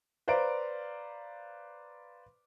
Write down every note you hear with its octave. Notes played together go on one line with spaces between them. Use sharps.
B4 C5 D5 F5 A#5 D7